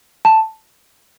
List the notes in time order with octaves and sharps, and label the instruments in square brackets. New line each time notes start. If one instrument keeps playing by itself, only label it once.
[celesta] A5